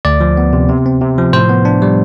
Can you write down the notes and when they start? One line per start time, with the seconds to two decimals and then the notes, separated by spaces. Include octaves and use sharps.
0.05 D2 D5
0.20 F3
0.37 B3
0.53 C3
0.69 C3
0.86 C4
1.01 C3
1.18 F3
1.33 A2 C5
1.49 B3
1.65 D4
1.82 G3